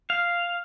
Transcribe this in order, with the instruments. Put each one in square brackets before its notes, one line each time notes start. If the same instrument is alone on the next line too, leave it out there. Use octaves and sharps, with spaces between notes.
[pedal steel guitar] F5